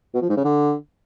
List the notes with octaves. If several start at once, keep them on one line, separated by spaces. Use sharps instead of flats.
B2
F3
G#2
C#3
D3